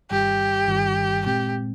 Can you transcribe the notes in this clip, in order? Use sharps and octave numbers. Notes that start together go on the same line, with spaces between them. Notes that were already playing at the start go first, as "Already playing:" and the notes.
G1 G2 D#3 G3 G4
G1 G2 D#3 G3
A#2 G#3 C4 G4